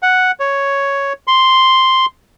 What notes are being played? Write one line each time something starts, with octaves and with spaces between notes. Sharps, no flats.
F#5
C#5
C6